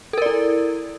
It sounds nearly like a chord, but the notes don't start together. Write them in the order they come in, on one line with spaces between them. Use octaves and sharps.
A4 A#4 D5 E4